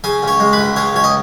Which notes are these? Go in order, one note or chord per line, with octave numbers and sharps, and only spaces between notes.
C#3 G#5
C#2
C#5
G#3
B4
C#2
C#3 C#5
C#2 C#5
D#5